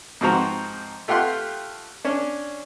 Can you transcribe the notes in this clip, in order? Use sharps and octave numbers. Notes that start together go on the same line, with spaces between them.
G#2 F3 C4 F#4 A#5
A3 F4 G4 F#5 C6
C#4 D4